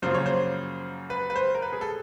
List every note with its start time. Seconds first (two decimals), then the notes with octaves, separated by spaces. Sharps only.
0.02 F#2 C#3 F3 A#3 C5
0.14 C#5
0.26 C5
1.10 B4
1.30 B4
1.36 C5
1.55 A#4
1.62 B4
1.73 G#4
1.81 A4